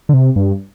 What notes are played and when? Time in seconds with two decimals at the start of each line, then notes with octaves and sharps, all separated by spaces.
0.09 D3
0.14 C3
0.36 G2